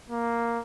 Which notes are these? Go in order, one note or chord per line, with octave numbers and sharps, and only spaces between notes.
A#3